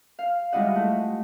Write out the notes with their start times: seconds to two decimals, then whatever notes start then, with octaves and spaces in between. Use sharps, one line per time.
0.19 F5
0.52 G3 G#3 E4 F4 D#5 F#5
0.76 A3